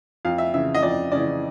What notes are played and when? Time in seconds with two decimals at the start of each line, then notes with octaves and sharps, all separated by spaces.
0.25 F2 F5
0.38 E5
0.54 C#3 E3 E5
0.75 D#5
0.83 F2 D5
1.12 C#3 E3 D5